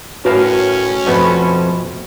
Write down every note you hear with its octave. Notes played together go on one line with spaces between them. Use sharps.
A2 C#4 F#4 A#4 B4 F5 A5
F2 B2 F3 A3 B3 B4